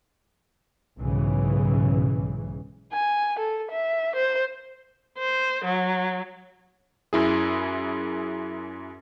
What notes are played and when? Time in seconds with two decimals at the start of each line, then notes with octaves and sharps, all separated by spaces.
0.98 B1 G#2 C#3 E3
2.93 G#5
3.39 A4
3.71 E5
4.16 C5
5.19 C5
5.65 F#3
7.13 F#2 E4 G#4